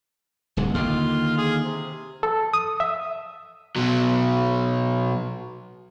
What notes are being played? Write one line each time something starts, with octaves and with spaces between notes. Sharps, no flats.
D1 C2 G#2
D#2 D3 F4
G#4
C3
A4
D#6
E5
B2 F#3